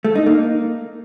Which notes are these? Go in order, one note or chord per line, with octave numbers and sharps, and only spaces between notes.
A3
D#4
A#3